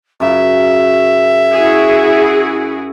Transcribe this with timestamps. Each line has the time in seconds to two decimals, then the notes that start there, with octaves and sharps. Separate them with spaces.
0.20 F#2 C#3 E5
1.52 E4 F#4 G#4